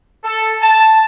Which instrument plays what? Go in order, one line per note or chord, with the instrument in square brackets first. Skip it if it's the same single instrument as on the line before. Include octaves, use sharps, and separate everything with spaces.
[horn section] A4
A5